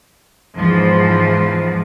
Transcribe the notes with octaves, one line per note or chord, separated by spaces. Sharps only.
E2 G#2 F3